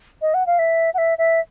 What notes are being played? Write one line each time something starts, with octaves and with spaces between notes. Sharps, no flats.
D#5
F#5
F5
E5
F#5
E5
E5